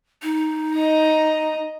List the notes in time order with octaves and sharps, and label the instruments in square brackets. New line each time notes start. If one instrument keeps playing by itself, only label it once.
[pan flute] D#4
[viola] D#5 A#5